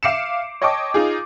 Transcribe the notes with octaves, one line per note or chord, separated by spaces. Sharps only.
E5 F5 D6 C7 C#7 E7
C#5 D#5 G5 A5 C#6 D6
D#4 F4 G#4